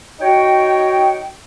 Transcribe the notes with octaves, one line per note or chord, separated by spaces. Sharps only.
D#4 F#4 C#5 G5